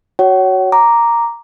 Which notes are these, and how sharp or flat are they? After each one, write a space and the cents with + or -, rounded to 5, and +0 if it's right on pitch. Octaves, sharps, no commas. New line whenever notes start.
F#4 +5 C#5 +5 F#5 +40
A#5 +0 D6 +0